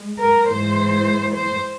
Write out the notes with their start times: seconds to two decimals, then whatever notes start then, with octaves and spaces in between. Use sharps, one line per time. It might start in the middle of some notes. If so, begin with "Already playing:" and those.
Already playing: G#3
0.19 A#4
0.47 G#2 E3 G#3 C5
1.34 C5